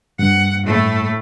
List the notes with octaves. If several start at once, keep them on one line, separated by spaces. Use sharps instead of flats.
G2 F#5
A2 A3